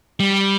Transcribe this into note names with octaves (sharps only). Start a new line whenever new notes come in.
G3